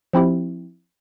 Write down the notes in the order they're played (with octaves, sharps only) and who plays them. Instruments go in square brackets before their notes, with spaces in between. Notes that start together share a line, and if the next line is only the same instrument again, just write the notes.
[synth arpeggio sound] F3 C4 E4 G4